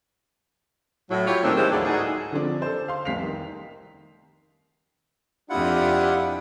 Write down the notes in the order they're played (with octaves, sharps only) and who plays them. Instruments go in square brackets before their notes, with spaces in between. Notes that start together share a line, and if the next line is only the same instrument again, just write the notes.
[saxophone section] A2 F#3
E4 F4 G4 C#5
A#2 D#3 G3 A3 C4 D4
E3 G#3 A#3 C#4 G4 C5
D2 G#2 F#3 D4 E4 D5
A2 D#4 F#4 G#4
[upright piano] D3 F3 C4 D4
A4 C5
F5 C6
F1 C2 B6 C7 F7
D#3
[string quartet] F2 C3 D#6 [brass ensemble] D4 G4 [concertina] E4 F4 F#5